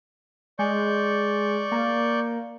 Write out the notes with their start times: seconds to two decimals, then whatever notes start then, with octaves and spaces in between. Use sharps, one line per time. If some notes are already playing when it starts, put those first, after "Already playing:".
0.59 G#3 D5 C#6 G6
1.72 A#3